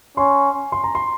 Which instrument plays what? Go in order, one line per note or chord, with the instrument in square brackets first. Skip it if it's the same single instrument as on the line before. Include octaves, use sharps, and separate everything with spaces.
[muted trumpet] C#4 [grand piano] C6
[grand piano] C6
A#5
C6